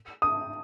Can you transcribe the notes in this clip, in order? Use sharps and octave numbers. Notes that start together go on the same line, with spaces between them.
D#6